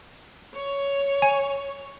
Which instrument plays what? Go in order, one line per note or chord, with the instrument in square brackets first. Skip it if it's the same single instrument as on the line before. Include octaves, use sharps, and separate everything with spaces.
[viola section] C#5
[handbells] G#5